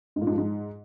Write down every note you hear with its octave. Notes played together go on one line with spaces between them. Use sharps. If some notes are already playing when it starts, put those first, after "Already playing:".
G#2
A#2
G#2
F3
G#2